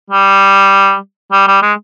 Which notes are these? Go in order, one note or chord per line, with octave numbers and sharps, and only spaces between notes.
G3
G3
G3
G#3